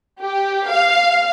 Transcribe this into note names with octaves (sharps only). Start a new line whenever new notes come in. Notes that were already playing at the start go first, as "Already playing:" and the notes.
G4
F5